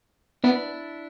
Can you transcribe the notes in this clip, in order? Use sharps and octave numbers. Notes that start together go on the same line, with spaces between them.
B3 D4 E4